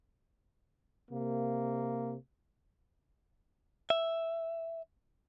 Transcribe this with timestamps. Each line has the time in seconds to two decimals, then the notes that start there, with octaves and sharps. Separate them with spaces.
1.11 C3 A#3
3.90 E5